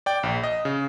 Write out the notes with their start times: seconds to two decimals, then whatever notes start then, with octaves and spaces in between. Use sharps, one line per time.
0.06 D5 G5
0.23 A#1
0.43 D#5
0.65 C#3